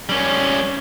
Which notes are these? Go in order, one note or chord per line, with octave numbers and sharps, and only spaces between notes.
G3 C#4